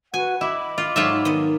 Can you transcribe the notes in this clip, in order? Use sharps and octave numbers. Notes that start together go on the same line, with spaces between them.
F#4 B4 F#5 G#5
E4 D#5 B5 D6
F4
G#2 F#3 F4 G#4 A4 E5
D#3 B3 D#5